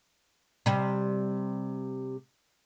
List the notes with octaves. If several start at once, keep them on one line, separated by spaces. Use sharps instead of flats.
C3 G3